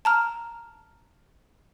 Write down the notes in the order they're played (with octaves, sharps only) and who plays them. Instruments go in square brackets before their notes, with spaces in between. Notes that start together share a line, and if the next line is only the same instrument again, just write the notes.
[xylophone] A5 A#5 F6